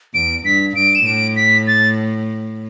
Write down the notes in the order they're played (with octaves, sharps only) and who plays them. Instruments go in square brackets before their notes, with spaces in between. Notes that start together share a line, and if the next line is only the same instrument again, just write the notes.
[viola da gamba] E2 [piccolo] D7
[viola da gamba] G2 [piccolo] B6
[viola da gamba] G2 [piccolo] D7
[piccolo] E7
[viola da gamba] A2 [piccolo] D7
[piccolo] B6
A6